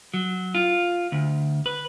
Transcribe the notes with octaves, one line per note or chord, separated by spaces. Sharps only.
F#3
F4
D2
B4